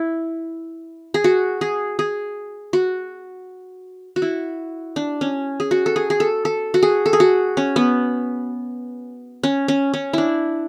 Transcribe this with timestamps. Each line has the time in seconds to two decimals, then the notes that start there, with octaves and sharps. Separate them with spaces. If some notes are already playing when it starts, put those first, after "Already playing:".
Already playing: E4
1.14 G#4
1.24 F#4
1.61 G#4
1.99 G#4
2.73 F#4
4.16 F#4
4.22 E4
4.96 D4
5.21 C#4
5.60 G#4
5.71 F#4
5.86 A4
5.96 G#4
6.10 G#4
6.20 A4
6.45 A4
6.74 F#4
6.83 G#4
7.06 A4
7.13 G#4
7.20 F#4
7.57 C#4
7.76 B3
9.43 C#4
9.68 C#4
9.94 C#4
10.13 D4 E4